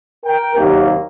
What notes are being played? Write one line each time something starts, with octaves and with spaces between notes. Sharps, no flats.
A#4 G5
D#2 C3 F#3 A#3